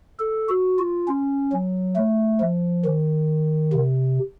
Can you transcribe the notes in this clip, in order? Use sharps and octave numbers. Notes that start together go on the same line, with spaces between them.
A4
F#4
F4
C#4
F#3
A3
F3
D#3
C3